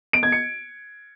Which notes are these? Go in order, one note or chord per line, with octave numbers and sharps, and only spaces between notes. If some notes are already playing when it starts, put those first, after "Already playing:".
D7
G#6
C#7